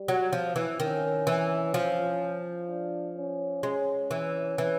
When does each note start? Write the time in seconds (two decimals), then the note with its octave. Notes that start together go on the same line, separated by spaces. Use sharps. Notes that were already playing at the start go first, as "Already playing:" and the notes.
Already playing: G3
0.08 F#3
0.33 F3
0.56 E3
0.80 D#3 C#4
1.27 E3
1.74 F3
2.68 D4
3.16 C#4
3.63 G#3 C#4
4.11 E3
4.58 E3